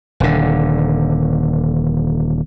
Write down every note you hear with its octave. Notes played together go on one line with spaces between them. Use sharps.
D#1 D3